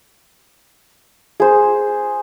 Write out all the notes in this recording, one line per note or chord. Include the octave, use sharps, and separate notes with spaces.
G#4 C5